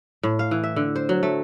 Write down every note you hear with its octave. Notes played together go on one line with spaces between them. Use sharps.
A2
F5
E3
E5
D3
C5
F#3
A3